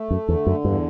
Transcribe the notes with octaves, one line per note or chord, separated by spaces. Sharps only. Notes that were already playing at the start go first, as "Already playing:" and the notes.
Already playing: A3
F#2
E2 D3
F#2
E2 G2